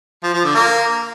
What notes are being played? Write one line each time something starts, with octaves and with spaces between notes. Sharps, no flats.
F3
F3
D3
A#3